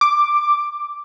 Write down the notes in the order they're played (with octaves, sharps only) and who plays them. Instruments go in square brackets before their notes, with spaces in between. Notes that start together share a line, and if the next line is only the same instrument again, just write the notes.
[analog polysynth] D6